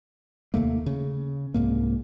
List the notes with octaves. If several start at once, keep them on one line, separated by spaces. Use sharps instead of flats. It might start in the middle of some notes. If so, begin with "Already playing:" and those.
D#2 C3 A3 A#3
C#3
C2 G#2 A#3